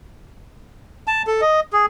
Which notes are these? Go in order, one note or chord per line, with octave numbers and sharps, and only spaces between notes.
A5
A4
D#5
G#4